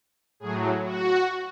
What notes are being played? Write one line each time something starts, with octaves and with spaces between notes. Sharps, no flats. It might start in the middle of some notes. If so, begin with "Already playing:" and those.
A2 F#3 G#4
F#4